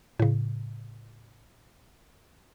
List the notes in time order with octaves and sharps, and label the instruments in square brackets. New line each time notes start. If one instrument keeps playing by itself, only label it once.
[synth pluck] A2 C#3